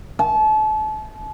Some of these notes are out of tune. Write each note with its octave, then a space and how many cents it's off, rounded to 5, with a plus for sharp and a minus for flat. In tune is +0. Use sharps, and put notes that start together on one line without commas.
A5 -35